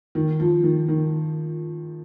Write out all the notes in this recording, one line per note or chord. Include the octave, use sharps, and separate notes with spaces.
D#3
F3
D#3
D#3